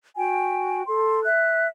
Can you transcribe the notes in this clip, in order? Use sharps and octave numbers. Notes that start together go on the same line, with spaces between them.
F#4 G5 G#5
A4 C6
E5 F#6